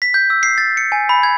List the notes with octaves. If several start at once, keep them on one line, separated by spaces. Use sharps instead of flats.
B6
G6
E6
C7
A6
C#7
G#5
B5
G#6